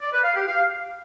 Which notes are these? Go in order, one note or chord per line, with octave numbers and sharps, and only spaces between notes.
D5
B4
F5
G4
F5